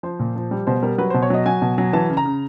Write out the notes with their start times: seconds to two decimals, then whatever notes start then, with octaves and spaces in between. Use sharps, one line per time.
0.03 F3 C5
0.19 A#2
0.36 F3
0.51 G3
0.67 B2 C5
0.82 G3 A#4
0.98 F#3 B4
1.10 B2 C5
1.22 C#5
1.30 F#3 D#5
1.46 F#3 G#5
1.62 B2
1.78 F#3
1.93 E3 A5
2.10 C#3
2.17 A#5
2.25 C#3